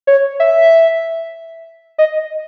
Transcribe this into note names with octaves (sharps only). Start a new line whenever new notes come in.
C#5
E5
D#5